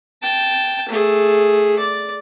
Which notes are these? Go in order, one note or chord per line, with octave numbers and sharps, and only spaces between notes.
G5 A5
A3 G#4
D5